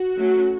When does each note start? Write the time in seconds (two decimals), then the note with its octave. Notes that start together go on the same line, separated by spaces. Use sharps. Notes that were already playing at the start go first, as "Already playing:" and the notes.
Already playing: F#4
0.17 F#3 A3 C#4